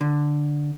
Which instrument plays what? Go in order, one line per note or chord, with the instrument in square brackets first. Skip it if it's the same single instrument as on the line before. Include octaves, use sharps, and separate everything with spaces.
[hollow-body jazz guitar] D3